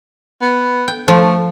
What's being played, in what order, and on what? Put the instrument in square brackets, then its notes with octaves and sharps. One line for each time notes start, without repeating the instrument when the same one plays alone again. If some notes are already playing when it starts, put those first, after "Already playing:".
[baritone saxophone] B3
[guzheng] G5
[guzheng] F3 [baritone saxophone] A3